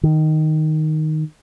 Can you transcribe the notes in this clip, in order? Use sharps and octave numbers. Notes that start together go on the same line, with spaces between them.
D#3